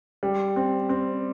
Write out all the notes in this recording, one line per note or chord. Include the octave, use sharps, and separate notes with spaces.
G3
C4
C4